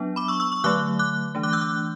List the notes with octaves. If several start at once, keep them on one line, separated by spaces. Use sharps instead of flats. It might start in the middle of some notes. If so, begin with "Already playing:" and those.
Already playing: F#3 B3 D4
B5 D6
C#6 E6
C#6 E6
C#6 E6
D3 F#3 A3 D6 F#6
D6 F#6
E3 A3 D4
D6 F#6
E6 G6
D6 F#6